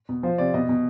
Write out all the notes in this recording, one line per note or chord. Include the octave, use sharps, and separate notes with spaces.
B2
F3 C5
C3 D5
B2 D#5
B2